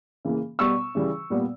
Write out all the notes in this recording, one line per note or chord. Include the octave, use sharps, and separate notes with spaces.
C#3 E3 A#3
B2 G3 B3 C#6 E6
C#3 E3 G3
A#2 G3 B3